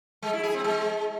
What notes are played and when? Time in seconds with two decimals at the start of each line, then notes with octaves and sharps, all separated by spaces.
0.22 G#3
0.33 E4
0.43 G#4
0.54 C4
0.64 G#3